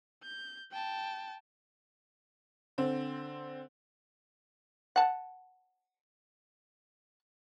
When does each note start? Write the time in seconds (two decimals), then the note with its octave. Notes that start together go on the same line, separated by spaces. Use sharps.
0.23 G6
0.72 G5 A5
2.78 D3 C4
4.96 F#5 A5